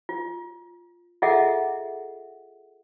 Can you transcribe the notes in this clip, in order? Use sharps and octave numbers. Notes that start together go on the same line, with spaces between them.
F4
F4 G#4 A4 D#5 E5 F#5